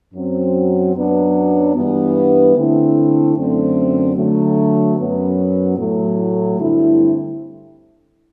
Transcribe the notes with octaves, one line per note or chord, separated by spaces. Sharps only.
F#2 F#3 C4
F#2 F#3 B3 D4
G2 E3 B3
D3 A3 C4 E4
F#2 D3 A3 C4
D3 F#3 A3
F#2 F#3 B3
A2 F#3 A3
G2 D3 A3 C4 E4